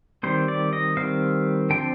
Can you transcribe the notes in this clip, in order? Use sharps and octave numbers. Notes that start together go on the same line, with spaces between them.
D#3 G3 C4 C5
D5
D#5
D#3 G3 C4 F5
D3 F3 C4 G5